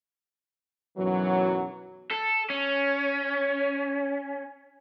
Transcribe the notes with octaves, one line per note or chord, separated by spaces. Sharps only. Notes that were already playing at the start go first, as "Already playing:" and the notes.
B1 F#2 E3 F#3
A4
C#4